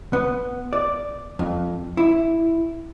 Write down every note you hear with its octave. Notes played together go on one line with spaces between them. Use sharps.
B3
D5
F2
E4